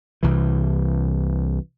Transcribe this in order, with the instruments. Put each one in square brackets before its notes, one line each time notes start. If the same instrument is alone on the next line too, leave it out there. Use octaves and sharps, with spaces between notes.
[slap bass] C2 E3